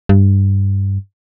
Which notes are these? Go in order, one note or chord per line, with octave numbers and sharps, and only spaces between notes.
G2